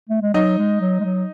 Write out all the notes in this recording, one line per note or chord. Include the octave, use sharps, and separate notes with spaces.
A3
G#3
F#3 D#4 D#5
G#3
F#3
G#3
F#3